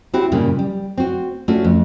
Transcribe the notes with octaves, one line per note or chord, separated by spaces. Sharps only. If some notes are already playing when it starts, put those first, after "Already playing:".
C4 E4 F#4 G4
G2 A#2 C#3 G3
G3
C4 F#4
A3 C#4 D4 F4 F#4
F2